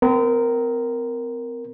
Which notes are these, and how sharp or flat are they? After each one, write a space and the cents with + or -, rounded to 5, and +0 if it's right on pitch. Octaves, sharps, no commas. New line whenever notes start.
C4 -40 A#4 +0